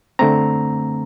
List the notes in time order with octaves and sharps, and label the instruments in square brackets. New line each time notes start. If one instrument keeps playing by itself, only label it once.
[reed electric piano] D3 A3 C4 A#5